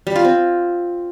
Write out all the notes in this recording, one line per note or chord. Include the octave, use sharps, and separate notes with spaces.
G3
F4
C4